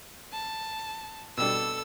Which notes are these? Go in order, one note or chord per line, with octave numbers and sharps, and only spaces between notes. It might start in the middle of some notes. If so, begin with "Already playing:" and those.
A5
B2 G3 D4 A4 E6